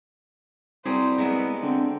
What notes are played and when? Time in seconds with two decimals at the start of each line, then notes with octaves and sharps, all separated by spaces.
0.85 C2 F#3 G3 G#4 C5
1.18 F#3 G#3 B3 E5
1.63 D3 C4